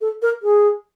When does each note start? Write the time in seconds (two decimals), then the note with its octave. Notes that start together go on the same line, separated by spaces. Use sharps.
0.01 A4
0.22 A#4
0.42 G#4